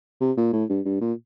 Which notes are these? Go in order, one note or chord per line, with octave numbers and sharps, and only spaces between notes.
C3
A#2
A2
G2
G2
A#2